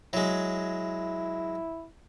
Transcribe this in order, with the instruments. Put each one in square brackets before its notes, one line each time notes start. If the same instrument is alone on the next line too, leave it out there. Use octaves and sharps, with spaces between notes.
[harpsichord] F#3 G#3 [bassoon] E4